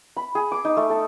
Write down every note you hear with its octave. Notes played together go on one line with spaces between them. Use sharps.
B5
G#4
D6
D#4
A3
A4